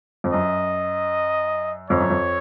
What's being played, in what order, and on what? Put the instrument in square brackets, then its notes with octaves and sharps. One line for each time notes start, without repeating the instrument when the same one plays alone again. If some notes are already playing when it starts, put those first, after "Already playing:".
[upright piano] F2
[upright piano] F#2 [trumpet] D#5
[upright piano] F2 [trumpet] C#5
[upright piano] F#2
F2